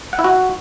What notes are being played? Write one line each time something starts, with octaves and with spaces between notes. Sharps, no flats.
F#5
E4
F#4